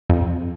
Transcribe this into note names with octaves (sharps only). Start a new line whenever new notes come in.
F2